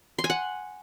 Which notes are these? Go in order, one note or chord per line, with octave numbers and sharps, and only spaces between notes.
C6
G#5
F#5